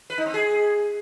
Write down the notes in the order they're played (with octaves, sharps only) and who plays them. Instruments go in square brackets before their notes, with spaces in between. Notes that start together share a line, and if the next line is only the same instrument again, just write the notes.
[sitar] B4
D#4
C4
G#4